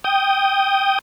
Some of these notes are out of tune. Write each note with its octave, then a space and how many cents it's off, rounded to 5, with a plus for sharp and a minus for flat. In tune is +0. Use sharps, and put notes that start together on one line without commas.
G5 +0 D#6 +0